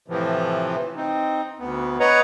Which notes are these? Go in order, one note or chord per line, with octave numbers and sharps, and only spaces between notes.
A2 C3 E3 F3
C4 D#4
D2 B3
B4 C#5 D#5 F#5 A#5